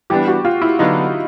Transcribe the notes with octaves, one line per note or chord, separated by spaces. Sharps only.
E3 G3 B3 D4 G4
F#4
F4
E4
D3 F#3 B3 D4 D#4